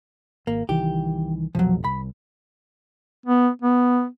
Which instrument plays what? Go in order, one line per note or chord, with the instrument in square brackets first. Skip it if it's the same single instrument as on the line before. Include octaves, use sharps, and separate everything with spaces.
[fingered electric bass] G#1 [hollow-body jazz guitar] A#3
[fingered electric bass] C2 D#3 E3 [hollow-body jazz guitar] G4
[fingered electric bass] F1 B1 [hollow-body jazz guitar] F3 F#3
[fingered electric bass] C2 [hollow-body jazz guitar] B5
[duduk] B3
B3